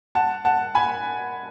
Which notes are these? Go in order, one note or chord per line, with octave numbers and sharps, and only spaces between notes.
F#5 A5
F#5 A5
G#5 B5